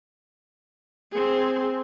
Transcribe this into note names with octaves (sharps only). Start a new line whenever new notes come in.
C4 G#4